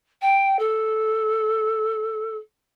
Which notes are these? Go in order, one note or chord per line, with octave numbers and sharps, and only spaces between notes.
G5
A4